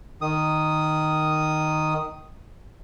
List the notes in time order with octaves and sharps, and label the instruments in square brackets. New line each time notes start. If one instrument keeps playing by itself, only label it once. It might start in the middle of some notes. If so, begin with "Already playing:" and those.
[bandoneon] D#3 D#6